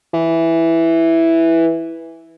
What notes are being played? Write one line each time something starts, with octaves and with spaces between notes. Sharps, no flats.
E3